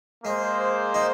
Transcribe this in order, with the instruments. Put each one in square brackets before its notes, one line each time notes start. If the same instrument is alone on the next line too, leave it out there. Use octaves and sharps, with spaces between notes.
[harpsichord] G#3 [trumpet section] A#3 G#4 C5
[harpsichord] D#4